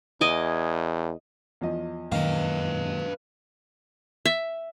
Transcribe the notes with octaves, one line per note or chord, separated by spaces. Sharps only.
E2 D#5 G#5 D6
E2 F3 D#5
F#2 A#2 D#3 B4 F5
E5